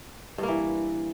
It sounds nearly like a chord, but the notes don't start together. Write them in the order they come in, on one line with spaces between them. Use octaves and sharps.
G2 A#3 E3